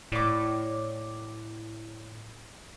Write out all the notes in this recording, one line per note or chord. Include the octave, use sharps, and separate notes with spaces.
A2 D5 D6